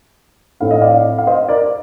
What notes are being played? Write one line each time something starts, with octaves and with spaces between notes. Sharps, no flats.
A2 A3 C4 F5
D#5
D5 F5
F5
C5 D#5
A#4 D5